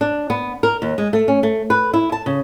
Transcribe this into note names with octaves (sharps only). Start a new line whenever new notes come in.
D4
B3
A#4
D#2
G#3
A3
C#4
A3
B4
E4
A5
C#3